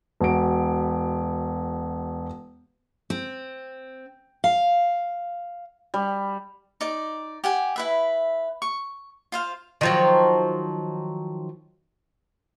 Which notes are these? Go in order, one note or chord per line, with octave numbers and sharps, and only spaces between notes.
E1 F#4 D7
C4
F5
G3
D#4 D5
G4 F#5 G#5
E4 B4 E5
C#6
F4 C5 F5
D#3 F3 F#3